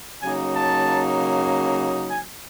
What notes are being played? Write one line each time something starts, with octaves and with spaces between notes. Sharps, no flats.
C#3 F#3 A#3 D#4 G#5
A5
G#5